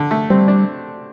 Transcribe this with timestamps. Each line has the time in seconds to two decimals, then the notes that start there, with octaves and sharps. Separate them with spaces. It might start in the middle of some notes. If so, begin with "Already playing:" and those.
Already playing: D3
0.11 A3
0.30 G3 C4
0.48 D4